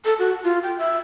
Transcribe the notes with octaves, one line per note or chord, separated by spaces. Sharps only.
A4
F#4
F4
G5
E5